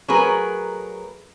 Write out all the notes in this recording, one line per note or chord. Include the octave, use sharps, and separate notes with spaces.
F#3 A3 G#4 A#4 B4